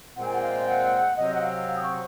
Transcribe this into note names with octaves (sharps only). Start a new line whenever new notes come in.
A#2 G#3 C4 F#5
G#5
F#5
F5
F#5
C3 F#3 C4 D#5
F#5
F5
D#6
C#6